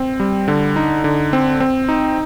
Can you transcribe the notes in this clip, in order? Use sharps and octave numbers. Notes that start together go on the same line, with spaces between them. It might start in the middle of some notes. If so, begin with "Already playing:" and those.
Already playing: C4
G3
D3
D#4
D3
C4
C4
D#4